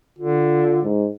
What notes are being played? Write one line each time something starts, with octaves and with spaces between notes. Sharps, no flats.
D3 F4
G#2